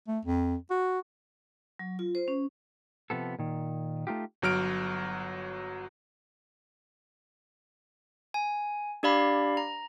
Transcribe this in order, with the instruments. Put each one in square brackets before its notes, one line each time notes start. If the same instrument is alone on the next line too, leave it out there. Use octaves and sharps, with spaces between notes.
[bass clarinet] A3
F2
F#4
[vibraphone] F#3
F4
C5
C#4
[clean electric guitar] C3 F3 B3 A4
A#2 D#3
A3 D#4 F4 G4
[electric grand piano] G1 F#3 F6 D7
[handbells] G#5
D4 G4 D5 F5 B5
A#5